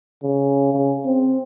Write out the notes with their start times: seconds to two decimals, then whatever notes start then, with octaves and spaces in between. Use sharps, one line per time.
0.23 C#3
0.73 C#3
1.06 C4